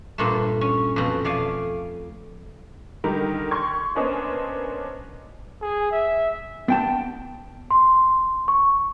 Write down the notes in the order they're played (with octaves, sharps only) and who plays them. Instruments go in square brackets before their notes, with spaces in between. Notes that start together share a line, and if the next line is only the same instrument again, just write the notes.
[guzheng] G2 A#2 A3
C#4
F2 B2
A3 D5 F5 G#5
[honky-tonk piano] D3 D#3 G3 G4 A#4
C6 C#6 G#6
A#3 B3 C#4 D4 C5 D#5
[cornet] G#4
E5
[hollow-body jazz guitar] B3 G5 A5
[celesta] C6
C#6